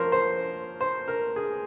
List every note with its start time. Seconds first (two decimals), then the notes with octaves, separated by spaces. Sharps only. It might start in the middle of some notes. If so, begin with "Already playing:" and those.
Already playing: F3 A#3 C#4 A#4 C5
0.12 C5
0.81 C5
1.08 A#4
1.36 G#4